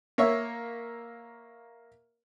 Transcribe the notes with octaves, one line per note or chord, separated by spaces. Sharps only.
A#3 C#5 E5